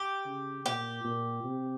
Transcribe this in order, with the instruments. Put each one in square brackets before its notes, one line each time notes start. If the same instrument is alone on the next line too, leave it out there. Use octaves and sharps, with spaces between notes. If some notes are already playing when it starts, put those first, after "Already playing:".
Already playing: [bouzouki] G4
[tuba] C#3
[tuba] A#2 [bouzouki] G4
[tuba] A#2
C3